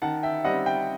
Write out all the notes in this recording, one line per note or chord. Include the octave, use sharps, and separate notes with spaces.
D#3 F#5 A5
E5 G5
G3 C4 D#5 F#5
E5 G5